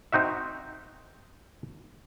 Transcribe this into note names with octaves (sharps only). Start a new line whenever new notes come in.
C4 D#4 F#4 E5